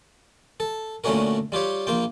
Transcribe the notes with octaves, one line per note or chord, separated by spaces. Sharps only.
A4
A#2 D3 A3 C#4 F#4 A#4
G3 F4 G4 C#5
A#1 A#3 F4 G5